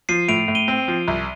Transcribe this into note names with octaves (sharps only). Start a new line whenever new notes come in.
F3 C7 D#7
A2 D7 F7
A2
D#7 G7
C4
F3
C2